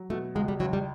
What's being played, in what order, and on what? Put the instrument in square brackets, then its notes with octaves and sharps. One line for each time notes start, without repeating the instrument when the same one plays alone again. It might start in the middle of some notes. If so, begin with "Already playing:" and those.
Already playing: [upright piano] F#3
[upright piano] B2 [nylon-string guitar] A3
[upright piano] C#2 [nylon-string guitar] G#3
[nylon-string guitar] G3
[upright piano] C#2 [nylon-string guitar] F#3
[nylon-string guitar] G3